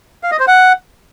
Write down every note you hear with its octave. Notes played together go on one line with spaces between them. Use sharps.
F5
D#5
C5
F#5